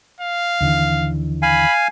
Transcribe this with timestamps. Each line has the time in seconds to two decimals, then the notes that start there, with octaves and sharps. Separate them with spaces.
0.20 F5
0.61 D#2 D3 E3
1.42 F5 G#5 B5